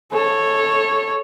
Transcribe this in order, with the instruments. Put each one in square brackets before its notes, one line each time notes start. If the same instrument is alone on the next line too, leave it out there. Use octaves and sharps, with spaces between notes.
[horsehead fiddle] A4 C#5